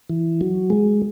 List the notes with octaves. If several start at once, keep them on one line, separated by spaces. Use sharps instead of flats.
E3
F#3
G#3